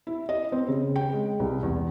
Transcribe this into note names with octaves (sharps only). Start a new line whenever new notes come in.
E4
D#5
C4
C#3
G5
G#3
C2
E2